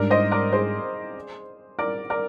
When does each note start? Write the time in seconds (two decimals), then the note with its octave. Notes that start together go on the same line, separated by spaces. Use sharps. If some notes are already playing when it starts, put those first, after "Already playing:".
Already playing: G#2 G3 D4 A#4 D5
0.10 C5 D#5
0.31 A#4 D5
0.52 G#4 C5
1.79 A#4 D5
2.10 A#4 D5